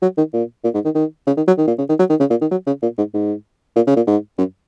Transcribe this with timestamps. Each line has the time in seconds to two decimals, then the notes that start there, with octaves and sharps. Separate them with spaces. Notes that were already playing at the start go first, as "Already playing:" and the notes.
0.02 F#3
0.18 D#3
0.33 A#2
0.64 A#2
0.74 G#2
0.85 D#3
0.95 D#3
1.27 C#3
1.37 D#3
1.47 F#3
1.58 D#3
1.68 A#2
1.78 C#3
1.89 D#3
1.99 F#3
2.10 D#3
2.20 C#3
2.30 A#2
2.41 D#3
2.51 F#3
2.67 C#3
2.82 A#2
2.98 G#2
3.14 G#2
3.76 A#2
3.87 C#3
3.96 A#2
4.07 G#2
4.38 F#2